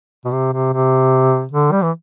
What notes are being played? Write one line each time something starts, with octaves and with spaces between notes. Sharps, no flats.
B2
C3
C3
C3
D3
G3
E3